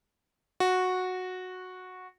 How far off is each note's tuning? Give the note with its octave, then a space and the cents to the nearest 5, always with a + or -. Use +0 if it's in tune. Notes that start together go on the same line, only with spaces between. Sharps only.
F#4 -10